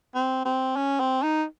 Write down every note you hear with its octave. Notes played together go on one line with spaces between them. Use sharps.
C4
C4
C#4
C4
D#4